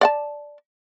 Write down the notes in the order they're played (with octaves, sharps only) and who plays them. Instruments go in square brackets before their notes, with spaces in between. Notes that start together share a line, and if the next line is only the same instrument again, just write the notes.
[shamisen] D5 F#5 A5